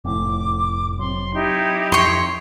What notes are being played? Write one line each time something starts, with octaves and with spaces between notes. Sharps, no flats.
F1 F2 A2 D6
F#3 C4 C6
D#4 E4 G4
F2 C#5 C6